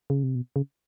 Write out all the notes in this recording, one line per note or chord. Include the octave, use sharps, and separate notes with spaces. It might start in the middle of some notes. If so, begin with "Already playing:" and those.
C#3
C3
B2
C#3